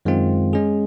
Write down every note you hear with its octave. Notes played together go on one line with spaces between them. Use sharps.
F#2 D#3 G#3 C4 F4
G#3 C#4 G#4